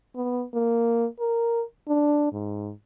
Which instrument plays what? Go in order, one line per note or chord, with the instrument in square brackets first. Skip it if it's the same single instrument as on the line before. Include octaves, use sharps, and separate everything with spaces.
[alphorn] B3
A#3
A#4
D4
G#2